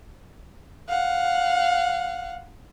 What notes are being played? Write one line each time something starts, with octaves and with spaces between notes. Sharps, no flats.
F5 F#5